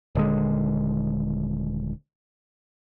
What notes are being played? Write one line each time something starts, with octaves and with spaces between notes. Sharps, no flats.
D#1 D3 G#3